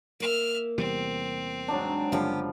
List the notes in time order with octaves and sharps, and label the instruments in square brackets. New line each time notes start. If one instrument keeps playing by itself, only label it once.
[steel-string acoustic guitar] A#3 [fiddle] E5 F6
[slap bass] E2 C3 G3 [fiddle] C4
[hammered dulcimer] G#2 F#3 D4
[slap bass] F#1 F#2 D3 [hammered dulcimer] F3 G3 [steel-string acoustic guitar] B3 G4